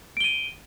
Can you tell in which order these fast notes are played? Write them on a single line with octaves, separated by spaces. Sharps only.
D7 G7 D#7